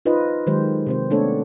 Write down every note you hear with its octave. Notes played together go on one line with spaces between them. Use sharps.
D#4 F4 B4 C5 D#5
D#3 F#3 G#3 G4 C5
C3 C4 C5
A3 B3 D4 A4 C#5